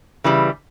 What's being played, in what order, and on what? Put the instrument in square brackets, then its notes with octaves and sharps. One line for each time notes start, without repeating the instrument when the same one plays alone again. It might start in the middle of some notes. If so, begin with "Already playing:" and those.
[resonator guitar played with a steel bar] C#3 E3 G3